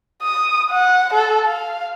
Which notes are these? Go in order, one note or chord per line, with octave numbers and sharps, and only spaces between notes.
D#6
F#5
A4
F5